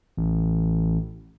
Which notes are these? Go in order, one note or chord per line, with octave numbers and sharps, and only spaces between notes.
A1